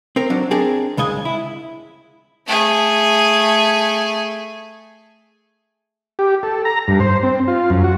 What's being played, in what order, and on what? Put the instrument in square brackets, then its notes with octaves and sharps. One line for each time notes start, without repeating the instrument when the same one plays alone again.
[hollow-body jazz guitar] C4 A#4
F#3 D4
C4 D4 G#4 A#4
C#2 C#3 G#3 D#5 G#5
E4
[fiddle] A3 G#4
[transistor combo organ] G4
A4
A#5
G2
C5
C4
F4
F#2
F#4